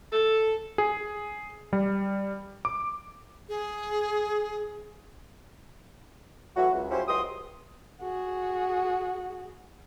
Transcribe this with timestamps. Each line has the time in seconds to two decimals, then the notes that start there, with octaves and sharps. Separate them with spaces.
0.11 A4
0.78 G#4
1.73 G3
2.65 D6
3.49 G#4
6.57 E3 F#3 A3 E4 F#4
6.73 C#2
6.91 F3 F#3 C#4 E4 G4 C5
7.08 C#2 F#3 G4 C6 D#6
8.01 F#4 G#4